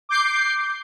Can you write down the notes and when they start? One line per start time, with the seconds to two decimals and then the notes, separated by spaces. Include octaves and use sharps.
0.09 D6 G6 C7